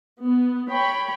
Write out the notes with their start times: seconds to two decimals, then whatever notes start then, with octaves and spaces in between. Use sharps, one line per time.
0.21 B3
0.70 C#5 G5 B5